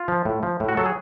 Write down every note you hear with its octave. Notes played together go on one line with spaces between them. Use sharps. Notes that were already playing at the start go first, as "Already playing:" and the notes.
Already playing: F4
F3
A2
F3
A2
F#4
F#3 A4
G#4